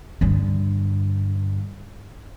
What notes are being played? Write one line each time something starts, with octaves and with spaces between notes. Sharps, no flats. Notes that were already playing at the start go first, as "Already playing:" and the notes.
G2 D3